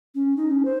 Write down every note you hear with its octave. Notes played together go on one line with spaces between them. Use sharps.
C#4
D#4
C#4
C5